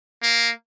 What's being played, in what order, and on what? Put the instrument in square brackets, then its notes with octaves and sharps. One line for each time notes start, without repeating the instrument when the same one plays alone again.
[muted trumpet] A#3